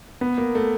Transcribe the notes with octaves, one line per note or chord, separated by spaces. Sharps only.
B3
A#3
A3